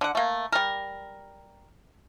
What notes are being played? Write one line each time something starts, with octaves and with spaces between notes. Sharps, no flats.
D3 F#5
A3 A#3
G3 A#4